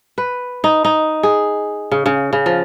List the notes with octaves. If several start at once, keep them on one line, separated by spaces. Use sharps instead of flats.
B4
D#4
D#4
G#4
C#3
C#3
C#3
F3